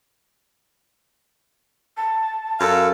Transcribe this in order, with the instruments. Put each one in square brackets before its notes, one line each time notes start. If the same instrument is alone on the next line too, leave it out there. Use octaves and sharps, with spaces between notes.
[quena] A5
[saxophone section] F#2 A4 F5